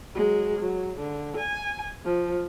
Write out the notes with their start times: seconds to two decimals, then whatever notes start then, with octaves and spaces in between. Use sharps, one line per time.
0.15 F#3 G#3
0.59 F#3
0.99 D3
1.37 G#5
2.05 F3